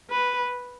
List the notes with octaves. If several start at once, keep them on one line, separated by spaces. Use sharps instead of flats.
B4